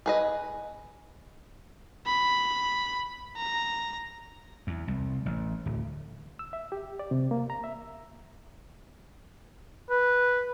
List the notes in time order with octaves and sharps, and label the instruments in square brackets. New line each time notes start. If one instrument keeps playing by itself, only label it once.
[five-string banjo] G#4 B4 D#5
[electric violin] B5
A#5
[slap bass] E2
C2
A1
D1
[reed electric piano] E6
E5
G4
D5
C3
A#3
A#5
E5
[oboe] B4